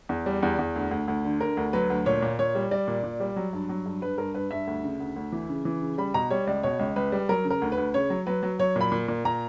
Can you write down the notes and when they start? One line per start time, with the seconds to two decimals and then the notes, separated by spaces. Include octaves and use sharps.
0.09 E2
0.26 G3
0.43 E2
0.59 E2
0.76 D2
0.91 D2
1.08 D2
1.24 D3
1.41 D3 A#4
1.57 D2
1.73 F#3 B4
1.90 D2
2.06 A#2 C#5
2.22 A#2
2.39 A#2 C#5
2.55 G3
2.71 G3 D5
2.88 A#2
3.03 A#2
3.20 G3
3.36 F#3
3.53 G2
3.69 F#3
3.86 G2
4.02 G2 B4
4.18 G2 A#4
4.34 G2 B4
4.51 G2 E5
4.67 D2
4.84 C#3
5.00 D2
5.16 D2
5.32 E3
5.49 C#3
5.65 E3
5.82 C#3
5.98 G3 B5
6.14 B2 A#5
6.30 G3 C#5
6.47 C#2 D5
6.63 B2 C#5
6.79 C#2
6.96 C#2 B4
7.12 G3
7.29 F#3 A#4
7.45 C#3
7.50 A#4
7.62 D2
7.72 B4
7.78 D2
7.94 C#3 C#5
8.10 F#3
8.27 F#3 B4
8.43 F#3
8.59 F#3 C#5
8.76 A#2 B5
8.92 A#2
9.08 A#2
9.25 A#2 A#5